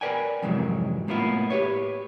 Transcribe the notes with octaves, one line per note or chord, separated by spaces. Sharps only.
A#4 B4 D5 G5 G#5
F2 G#2 C3 E3 F#3
A2 A#3 B3 E4 F4
G4 B4 C#5